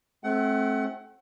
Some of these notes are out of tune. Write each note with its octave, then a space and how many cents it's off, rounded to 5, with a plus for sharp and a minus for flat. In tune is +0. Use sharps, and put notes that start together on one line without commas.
A3 -25 C4 +25 F#5 +25